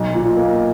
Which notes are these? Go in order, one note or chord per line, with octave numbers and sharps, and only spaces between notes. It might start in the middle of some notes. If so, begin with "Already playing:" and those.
Already playing: B1
A#2
A#3